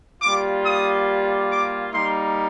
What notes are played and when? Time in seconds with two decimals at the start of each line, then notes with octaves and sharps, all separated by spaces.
0.22 G3 A#3 F4 D6
0.64 D#6
1.50 D6
1.92 G3 A#3 D#4 C6